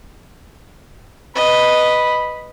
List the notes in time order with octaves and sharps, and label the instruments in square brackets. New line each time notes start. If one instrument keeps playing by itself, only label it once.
[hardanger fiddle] B4 D#5 [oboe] B5